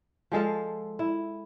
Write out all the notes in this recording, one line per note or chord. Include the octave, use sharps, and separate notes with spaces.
F3 G#3 A4 F5
E4